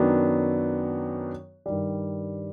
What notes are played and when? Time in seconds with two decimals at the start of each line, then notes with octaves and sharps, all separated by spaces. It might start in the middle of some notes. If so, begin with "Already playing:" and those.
Already playing: F#2 D#3 F#3 B3 D4
1.66 G2 D#3 G3